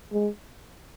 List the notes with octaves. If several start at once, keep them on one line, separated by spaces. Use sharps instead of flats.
G#3